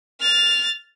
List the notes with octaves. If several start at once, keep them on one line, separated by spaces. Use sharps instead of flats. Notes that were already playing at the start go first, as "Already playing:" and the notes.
F6 A6